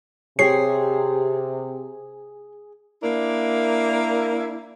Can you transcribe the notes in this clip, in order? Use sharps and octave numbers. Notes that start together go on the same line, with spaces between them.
C3 G4 G#4 C#5 C7
A#3 D4 E4 A#4